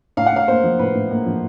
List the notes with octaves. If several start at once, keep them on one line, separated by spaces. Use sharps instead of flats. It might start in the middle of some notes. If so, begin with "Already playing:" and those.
A2 F5
F#5
A2 F5
A#3 C5
F3
A2 B4
A2
A#3
F3